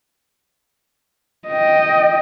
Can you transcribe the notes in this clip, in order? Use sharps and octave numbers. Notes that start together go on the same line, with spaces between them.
D#5 G5